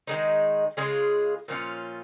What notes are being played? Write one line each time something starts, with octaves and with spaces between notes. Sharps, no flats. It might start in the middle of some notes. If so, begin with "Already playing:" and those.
D#3 G#3 D#4
C#3 G#3 F4 G#4
A#2 F3 C#4 F4